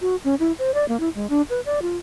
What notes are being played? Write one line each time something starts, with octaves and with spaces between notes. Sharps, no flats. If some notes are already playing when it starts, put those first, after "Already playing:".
F#4
C#4
E4
C5
D5
A#3
E4
G#3
D4
B4
D5
F4